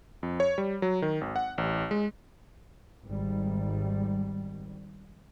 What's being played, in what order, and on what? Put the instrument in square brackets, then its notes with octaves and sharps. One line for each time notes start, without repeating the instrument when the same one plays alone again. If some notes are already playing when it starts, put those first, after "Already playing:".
[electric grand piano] F2
C#5
G3
F#3
D#3
G#1
F#5
A1
G#3
[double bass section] G#1 G3